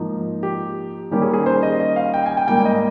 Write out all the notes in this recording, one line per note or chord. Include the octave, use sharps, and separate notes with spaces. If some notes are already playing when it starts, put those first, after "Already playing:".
Already playing: G#2 F3 A#3 D#4
G4
D#3 G3 A#3 C#4 G4
G#4
G#4
C5
D#5
D#5
F5
G5
G#5
G5
G#2 G3 A#3 G5
D#5